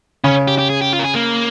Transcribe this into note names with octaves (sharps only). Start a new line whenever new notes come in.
C#3 C#4
G4
G4
G#4
G4
F4
A#4
G#4
A#3